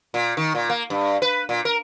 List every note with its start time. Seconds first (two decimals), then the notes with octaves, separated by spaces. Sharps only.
0.14 A#2
0.37 D#3
0.55 A#2
0.70 A#3
0.90 G2
1.22 B4
1.49 A#2
1.65 A#4